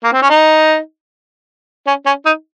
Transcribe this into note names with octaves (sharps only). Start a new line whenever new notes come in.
A#3
C4
C#4
D#4
C#4
C#4
D#4